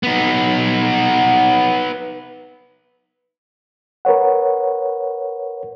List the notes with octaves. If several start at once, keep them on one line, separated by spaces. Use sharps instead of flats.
B3 D#4
A#4 B4 C#5 F#5